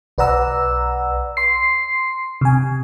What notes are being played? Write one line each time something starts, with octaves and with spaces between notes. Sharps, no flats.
B1 B4 D5 F#5 A#5 E6
C6 C7
C3 G#5